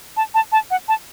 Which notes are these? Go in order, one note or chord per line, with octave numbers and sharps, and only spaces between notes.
A5
A5
A5
F#5
A5